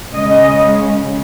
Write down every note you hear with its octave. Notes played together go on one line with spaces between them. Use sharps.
C#3 G#3 C#4 D#5